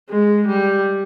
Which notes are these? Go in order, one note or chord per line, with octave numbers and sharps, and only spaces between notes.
G#3
G3